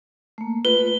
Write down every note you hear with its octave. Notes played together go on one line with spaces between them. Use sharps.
A3 A#3
F4 B4 G7